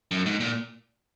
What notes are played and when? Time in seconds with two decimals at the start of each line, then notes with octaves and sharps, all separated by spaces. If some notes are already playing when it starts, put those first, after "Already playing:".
0.11 F#2
0.26 G#2
0.40 A#2